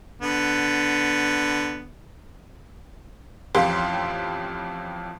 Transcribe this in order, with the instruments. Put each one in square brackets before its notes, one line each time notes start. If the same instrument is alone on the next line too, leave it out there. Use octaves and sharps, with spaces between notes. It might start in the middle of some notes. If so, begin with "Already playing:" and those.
[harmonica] D3 B3
[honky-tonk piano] A1 F2 G4 F5 C6